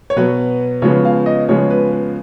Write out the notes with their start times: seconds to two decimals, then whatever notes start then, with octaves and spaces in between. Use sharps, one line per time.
0.10 C#5
0.16 B2 F#3 B3 B4
0.82 C#3 F3 G#3 B3 C#5
1.05 F5
1.26 D#5
1.49 C#3 F3 G#3 B3 C#5
1.70 B4
1.92 B4